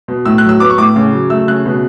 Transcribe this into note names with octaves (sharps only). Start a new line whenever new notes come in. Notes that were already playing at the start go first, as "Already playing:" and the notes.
B2
A2 E6
F#3 F#6
E6
B3 D6
C#6
A2 D6
C#3
F#3
A3 E6
C#3 F#6
B2